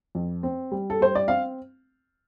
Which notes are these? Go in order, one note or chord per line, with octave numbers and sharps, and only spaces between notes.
F2
C4
G3
A4
G3 C5
D5
C4 F5